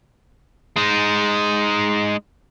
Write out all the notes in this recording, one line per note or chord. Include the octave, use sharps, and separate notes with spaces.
G#3 D#4